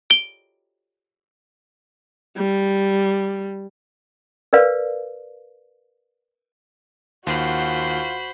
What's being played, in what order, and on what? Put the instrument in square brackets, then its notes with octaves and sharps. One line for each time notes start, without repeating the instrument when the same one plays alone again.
[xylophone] D7 G7
[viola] G3
[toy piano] A#4 B4 D5 F5
[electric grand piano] D#2 [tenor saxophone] F4 [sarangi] F#4 [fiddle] C5 B5